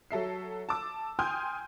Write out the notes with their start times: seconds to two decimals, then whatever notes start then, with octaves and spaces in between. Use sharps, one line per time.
0.11 F#3 A4 E5 C7
0.69 A5 D6 E6
1.19 G5 G#5 C6 D#6 F6 G6